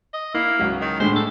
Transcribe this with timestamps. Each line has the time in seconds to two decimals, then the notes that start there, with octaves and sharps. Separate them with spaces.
0.14 D#5
0.34 A#3 E4
0.59 C#2 F#3
0.82 D#3
1.00 A2 D3 G#3 C5
1.16 A4